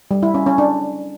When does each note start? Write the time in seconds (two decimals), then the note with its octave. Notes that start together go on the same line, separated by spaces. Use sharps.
0.11 G3
0.23 E4
0.34 C#4
0.46 C#4
0.58 D4